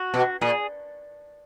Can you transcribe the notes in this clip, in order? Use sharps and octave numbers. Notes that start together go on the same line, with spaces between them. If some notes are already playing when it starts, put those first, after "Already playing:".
Already playing: F#4
B2
A#2 G#4